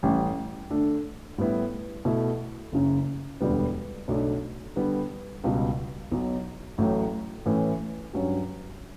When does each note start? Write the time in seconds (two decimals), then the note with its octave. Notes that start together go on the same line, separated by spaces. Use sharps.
0.03 A1 A2 G3 C#4
0.70 D3 A3 D4 A4
1.38 A2 G3 B3 E4
2.05 B2 A3 E4
2.72 F#1 F#2 C#3
3.41 E1 D2 D3 G3 B3
4.08 B1 B2 A3 D4
4.76 D3 G3 B3
5.44 C#2 B2 G3
6.11 B1 B2 F#3
6.78 A1 A2 F#3 A3
7.46 A2 E3 A3 C#4
8.13 G2 F#3 C#4 G4